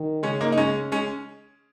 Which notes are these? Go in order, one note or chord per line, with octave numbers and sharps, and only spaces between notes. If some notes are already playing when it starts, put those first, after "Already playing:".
Already playing: D#3
C#3 G#3 C#4
A#3 D#4
D#4
G#3 C#4
G#3 C#4